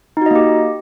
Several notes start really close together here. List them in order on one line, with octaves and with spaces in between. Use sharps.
D#4 F#4 D#5 A#3 G4